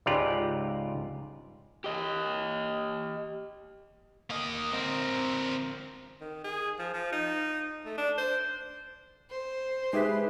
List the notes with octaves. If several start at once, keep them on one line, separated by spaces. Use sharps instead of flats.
C#2 G#2 F4 G4 D5 A#5
G4 D#5
A#3 D#5
C4 A#4
D#3
G#4
F3
F3
D#4
A3
D4
C5
C5
G#3 D#4 G4 G#4 B4 E5 B6